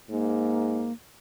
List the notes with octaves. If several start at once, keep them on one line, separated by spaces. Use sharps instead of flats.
G#2 A#3